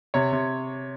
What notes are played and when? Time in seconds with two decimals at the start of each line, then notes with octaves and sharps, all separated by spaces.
0.14 C3 C#5
0.33 C3